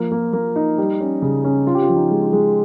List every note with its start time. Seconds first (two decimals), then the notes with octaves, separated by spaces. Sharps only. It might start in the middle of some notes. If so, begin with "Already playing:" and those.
Already playing: F3 A#3
0.12 A#3
0.33 A#3
0.56 D#4
0.78 G3
1.01 C#4
1.22 C#3
1.44 C#4
1.67 C#4 F4
1.75 G4
1.83 F4
1.89 F3
1.96 D#4
2.11 G#3
2.26 F4
2.33 G#3